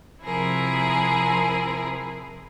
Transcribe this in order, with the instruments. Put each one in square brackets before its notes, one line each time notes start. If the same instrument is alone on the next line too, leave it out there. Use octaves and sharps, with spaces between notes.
[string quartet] C3 F3 E4 G#4 A#4